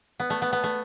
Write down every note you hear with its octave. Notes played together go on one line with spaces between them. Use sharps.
B3
A3
B3
B3
A3